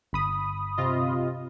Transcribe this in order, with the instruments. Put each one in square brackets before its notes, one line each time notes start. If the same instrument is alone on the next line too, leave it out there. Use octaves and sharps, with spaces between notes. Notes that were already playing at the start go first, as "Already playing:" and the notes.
[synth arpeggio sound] G1 B5 D#6
[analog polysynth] C3 F4 D#5